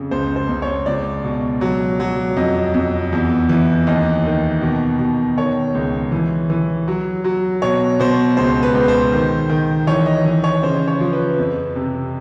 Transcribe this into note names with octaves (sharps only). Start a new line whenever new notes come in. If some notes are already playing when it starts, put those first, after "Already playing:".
Already playing: F2 C#3
C#2 C5
C5
C#2
C#5
C#2 D5
B2
F#3
F#3
F2 D#5
F2
E2
E3
D#2 D#5
D#3
B2
B2
D#3 C#5
C#2
E3
E3
F#3
F#3
B2 C#5
B2 C5
C#2 C5
B4
C#2
C5
D#3
D#3
E3 C#5
D#5
E3 D#5
C#5
C#3 C5
C#5
F3
B4
F2
C3